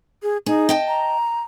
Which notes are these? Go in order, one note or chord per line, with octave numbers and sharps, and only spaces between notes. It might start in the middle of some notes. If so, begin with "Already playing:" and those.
G#4
D#4 G#4
D#5 G5 A5
A#5